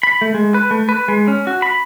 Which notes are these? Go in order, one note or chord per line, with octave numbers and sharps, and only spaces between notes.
B5
A3
G#3
B4
A3
B4
G#3
C#4
F#4
B5